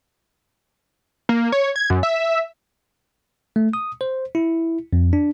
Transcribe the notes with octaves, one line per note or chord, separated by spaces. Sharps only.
A#3
C#5
G#6
F#2
E5
A3
D#6
C5
E4
F2
D4